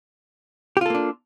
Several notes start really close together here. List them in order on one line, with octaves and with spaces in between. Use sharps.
G4 F4 A4 A#3 D4